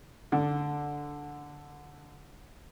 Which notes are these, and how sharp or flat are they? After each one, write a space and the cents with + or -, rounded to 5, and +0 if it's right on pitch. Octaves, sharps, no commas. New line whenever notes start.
D3 -5